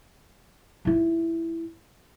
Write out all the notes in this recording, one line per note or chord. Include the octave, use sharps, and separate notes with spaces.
G#2 E4